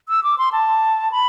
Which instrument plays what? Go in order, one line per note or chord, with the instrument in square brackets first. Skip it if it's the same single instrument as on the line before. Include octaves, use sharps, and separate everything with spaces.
[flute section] E6
D6
C6
A5
B5